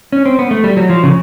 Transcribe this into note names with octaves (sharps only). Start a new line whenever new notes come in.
C#4
C4
B3
A3
G3
F#3
F3
C#3